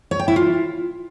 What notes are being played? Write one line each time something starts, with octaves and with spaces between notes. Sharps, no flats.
C#5
G5
E4
F4